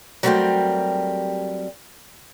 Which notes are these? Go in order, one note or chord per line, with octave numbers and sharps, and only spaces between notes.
F#3 G3 A3 C4 G4 A#4